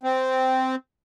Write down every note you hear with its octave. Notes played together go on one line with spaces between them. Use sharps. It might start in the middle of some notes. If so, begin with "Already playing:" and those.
C4